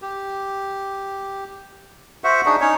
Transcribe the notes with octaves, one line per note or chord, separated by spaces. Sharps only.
G4
F#4 C5 E5 F#5
D4 D#4 F#4 G#4
C#4 D#4 C#5